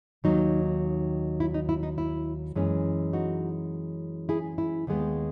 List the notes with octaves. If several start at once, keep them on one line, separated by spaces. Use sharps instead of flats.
D#2 D#3 F#3 D#4
E4
D#4
E4
D#4
E4
F#2 E3 G#3 C#4
D#4 F#4
E4 G#4
E4
D#2 D#3 G#3 B3